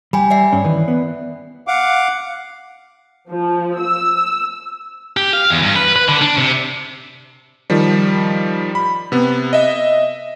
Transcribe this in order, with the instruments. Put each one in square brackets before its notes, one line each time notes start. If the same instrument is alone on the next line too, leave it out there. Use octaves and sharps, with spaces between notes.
[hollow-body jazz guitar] G3 [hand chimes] G5 G#5 B5
[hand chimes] D5 E5 C7
[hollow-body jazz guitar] G2 C#4
D#3 E3 B4
B3
[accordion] F5 F#5 D6
[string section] F3
E6
[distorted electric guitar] G4
F5
E2
G2
B4
B4
D3
D4
C3
[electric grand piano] D#3 F3 G3
B5
C3 B3
D#5 E5